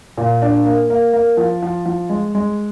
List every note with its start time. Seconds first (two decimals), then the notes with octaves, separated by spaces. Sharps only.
0.18 A#2
0.42 D4
0.66 A#3
0.90 A#3
1.13 A#3
1.37 F3
1.62 F3
1.86 F3
2.09 G#3
2.35 G#3